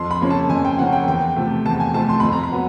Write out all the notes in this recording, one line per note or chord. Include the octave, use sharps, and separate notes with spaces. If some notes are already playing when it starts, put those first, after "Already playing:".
Already playing: F2 C6
B5
C#3 F3 A#3 C#4
A5
F2 G#5
G5
C#3 F3 A#3 C#4 F#5
G5
E2 G5
C3 F3 A3
E2 A5
G#5
C3 F3 A3 A5
C6
F2 B5
A#5
B5
F#3 B3